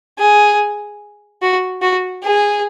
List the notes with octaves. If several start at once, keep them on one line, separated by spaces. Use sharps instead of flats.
G#4
F#4
F#4
G#4